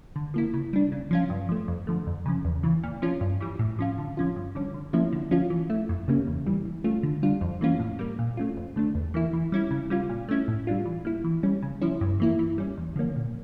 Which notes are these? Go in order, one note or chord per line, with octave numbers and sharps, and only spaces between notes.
D3
F3 A#3 E4
C#3
G3 D4
C#3
F3 C#4 F4
G2
F3 A3
F2
D3 F3 A3
F2
C#3 F3 C#4
E2
C#3 E3
A#2
F3 C#4 F4
G2
E3 G3
A2
F3 C#4 F4
D3
F3 C#4 F4
G2
D3 G3 C#4
D3
F3 A#3 C#4 E4
D3
F3 C#4 F4
E3
A3 E4
F2
C#3 G3 A#3 C#4
E2
E3 G3
E3
A3 C#4 F4
D3
G3 D4 F4
F2
E3 A#3 C#4 F4
A2
G3 A#3
A#2
A3 C#4 F4
F2
D3 A3 D4
E2
E3 A#3 E4
E3
G3 C#4 E4
C#3
G3 C#4 F4
A#2
A3 C#4 E4
A2
G3 D4 F4
E3
A#3 E4
E3
G3 C#4
C#3
F3 C#4 E4
G2
E3 A#3 E4
E3
G3 C#4
E2
D3 F3 A#3 C#4
A#2